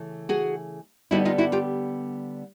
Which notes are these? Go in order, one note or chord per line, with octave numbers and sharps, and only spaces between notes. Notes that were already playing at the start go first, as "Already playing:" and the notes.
Already playing: C#3 E3 A3
F#4 G#4
D3 G3 B3 D#4 E4 F#4
D#4 F4
E4 F#4
F4 G4